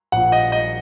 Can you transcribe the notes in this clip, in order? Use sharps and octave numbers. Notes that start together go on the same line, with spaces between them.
A#1 A#2 F#5
D#5
D#5